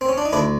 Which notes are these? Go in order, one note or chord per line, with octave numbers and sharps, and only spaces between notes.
C4
C#4
D4
D#4
D2 D4 E4